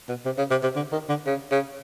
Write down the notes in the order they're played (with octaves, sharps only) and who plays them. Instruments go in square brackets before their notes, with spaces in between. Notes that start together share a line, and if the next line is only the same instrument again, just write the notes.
[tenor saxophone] B2
C3
C#3
C3
C3
D3
D#3
D3
C#3
C#3